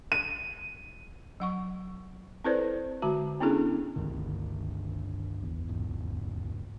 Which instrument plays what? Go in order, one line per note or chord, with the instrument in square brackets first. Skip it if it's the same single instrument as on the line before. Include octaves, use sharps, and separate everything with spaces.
[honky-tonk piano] D#7
[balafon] F#3 F#5 C#6
C4 E4 A4 B4 C5 D5
D3 G#3 F#4 A5
B3 C#4 D4 E4 G#4 A4
[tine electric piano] G#1 C#2 D#3 [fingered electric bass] G2 D3 A3
[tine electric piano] A1 E2
[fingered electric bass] D2 G#2